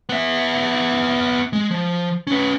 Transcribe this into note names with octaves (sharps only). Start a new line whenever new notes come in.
B3 E5
G#3
F3
C#4 B4